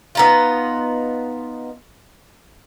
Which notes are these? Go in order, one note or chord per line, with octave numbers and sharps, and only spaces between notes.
B3 D#4 F4